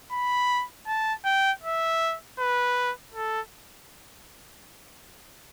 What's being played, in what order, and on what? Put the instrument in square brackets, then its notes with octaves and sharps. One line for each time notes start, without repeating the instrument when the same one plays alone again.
[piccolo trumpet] B5
A5
G5
E5
B4
A4